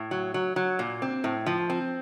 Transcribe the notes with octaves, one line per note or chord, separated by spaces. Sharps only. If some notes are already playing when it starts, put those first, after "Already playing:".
Already playing: A2
F#3
F#3
F#3
A#2
C4
A2
F3
C4